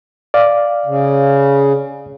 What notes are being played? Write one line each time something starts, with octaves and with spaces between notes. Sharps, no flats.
D5 F5
C#3